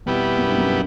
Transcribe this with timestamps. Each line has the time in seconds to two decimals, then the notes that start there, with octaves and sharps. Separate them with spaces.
0.06 F2 B2 G3 B3 E4 G4
0.38 F#2
0.48 G2
0.58 F#2